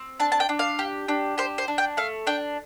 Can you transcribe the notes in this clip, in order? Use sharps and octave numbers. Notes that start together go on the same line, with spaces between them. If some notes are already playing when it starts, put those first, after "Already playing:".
Already playing: C4
D4 A5
A5
G5
D4
F5
G4
D4
G4 C5
C5
D4
G5
A3 F5
D4 G5